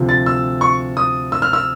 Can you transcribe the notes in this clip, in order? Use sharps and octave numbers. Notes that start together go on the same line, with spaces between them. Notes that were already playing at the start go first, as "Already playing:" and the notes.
Already playing: D2 C3 F3
A6
E6
C#6
D#6
E6
F6
E6